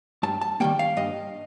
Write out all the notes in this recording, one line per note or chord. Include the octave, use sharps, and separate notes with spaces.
G2 A5
A5
D#3 G3 A#3 G5
F5
G2 D#5